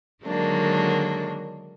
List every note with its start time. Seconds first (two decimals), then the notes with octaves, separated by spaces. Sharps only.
0.24 D3 D#3 F#3 G#3 A#3 D4